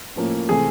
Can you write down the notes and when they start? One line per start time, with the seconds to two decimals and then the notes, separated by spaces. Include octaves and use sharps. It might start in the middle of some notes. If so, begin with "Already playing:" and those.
0.16 A2 F3 A#3 C#4
0.49 C3 E3 A3 C4 G#4